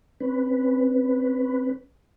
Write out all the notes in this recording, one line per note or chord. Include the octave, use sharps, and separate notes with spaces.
C4 C#4 B4